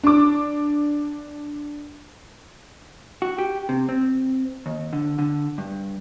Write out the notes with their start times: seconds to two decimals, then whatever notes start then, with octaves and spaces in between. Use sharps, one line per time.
0.03 D4 D6
3.22 F#4
3.38 G4
3.69 C3
3.89 C4
4.66 D#2
4.93 D3
5.19 D3
5.58 G2